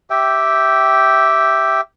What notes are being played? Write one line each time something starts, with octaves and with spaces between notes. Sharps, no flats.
G4 E5 G5